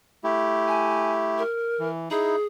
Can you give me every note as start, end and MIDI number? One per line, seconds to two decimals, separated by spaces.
0.24 1.43 57
0.24 1.43 64
0.24 1.43 67
0.68 1.12 80
1.38 1.88 70
1.79 2.09 52
2.11 2.36 63
2.11 2.36 64
2.11 2.46 68